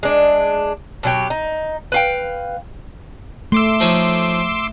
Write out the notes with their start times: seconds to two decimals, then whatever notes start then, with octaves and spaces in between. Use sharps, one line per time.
0.03 G#3 D4
1.03 B2 F#3 G4
1.30 D#4
1.92 B4 F5 G5
3.52 A3 C6 D6 E6
3.80 F3 D#4 C#5